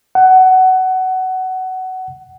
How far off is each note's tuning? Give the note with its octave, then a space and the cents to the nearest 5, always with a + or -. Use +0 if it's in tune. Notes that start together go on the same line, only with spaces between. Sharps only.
F#5 +15